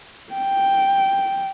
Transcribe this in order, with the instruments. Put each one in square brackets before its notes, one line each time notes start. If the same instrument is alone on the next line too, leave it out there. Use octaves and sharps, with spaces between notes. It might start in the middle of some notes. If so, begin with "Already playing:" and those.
[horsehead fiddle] G5